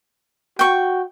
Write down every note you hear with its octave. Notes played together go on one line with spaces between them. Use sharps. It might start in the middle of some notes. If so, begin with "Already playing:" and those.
F#4 G5 C#6